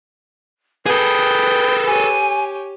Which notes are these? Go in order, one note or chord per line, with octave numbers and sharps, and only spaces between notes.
G#4 A4 B4 G5 D#6
G4 C#5 G#5